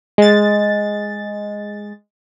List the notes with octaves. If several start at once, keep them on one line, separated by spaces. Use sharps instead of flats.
G#3 A6